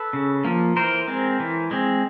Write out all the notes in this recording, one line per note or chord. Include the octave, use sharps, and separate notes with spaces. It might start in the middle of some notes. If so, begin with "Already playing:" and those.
Already playing: A4 B4
C#3
F3 A#3
E3 A#4 C5
G#3 C4
E3
G#3 C4